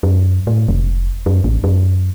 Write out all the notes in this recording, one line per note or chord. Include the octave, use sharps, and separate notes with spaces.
F#2
A2
F1
F#2
A1
F#2